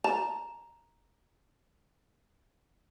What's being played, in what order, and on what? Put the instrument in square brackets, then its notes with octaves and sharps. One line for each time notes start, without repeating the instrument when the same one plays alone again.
[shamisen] A5 [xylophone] A#5